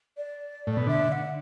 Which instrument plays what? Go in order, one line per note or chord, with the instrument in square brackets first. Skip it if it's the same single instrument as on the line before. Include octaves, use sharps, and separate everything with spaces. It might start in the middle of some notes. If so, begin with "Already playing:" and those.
[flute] D5
[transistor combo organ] A2
B2
[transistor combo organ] D3 [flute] E5
[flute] F#5